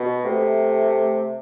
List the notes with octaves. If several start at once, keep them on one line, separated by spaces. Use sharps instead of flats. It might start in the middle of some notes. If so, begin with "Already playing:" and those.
Already playing: B2
C3 A3